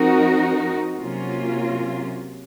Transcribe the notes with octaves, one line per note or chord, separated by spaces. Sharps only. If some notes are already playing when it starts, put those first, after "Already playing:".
Already playing: F3 C4 D#4 F#4 A#4
C3 F#3 A#3 C#4 F4